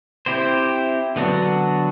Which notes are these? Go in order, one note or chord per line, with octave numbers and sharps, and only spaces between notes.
C4 E4 G4 C5
D3 F#3 B3 D4 F#4